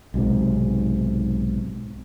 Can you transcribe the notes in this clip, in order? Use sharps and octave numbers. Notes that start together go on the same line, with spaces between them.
B1 G#2 C3